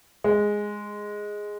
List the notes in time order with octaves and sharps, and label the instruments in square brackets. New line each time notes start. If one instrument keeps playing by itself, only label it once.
[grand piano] G#3